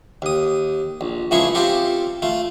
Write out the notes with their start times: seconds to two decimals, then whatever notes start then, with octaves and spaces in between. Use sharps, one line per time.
0.22 D#2 D#6
1.01 A#1
1.31 C#2 F3 A3 E4 G#4 C#6
1.55 C4 F4 G4 A4
2.22 A3 F4